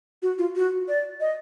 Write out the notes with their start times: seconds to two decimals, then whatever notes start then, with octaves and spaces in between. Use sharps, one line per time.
0.22 F#4
0.38 F4
0.56 F#4
0.88 D5
1.21 D#5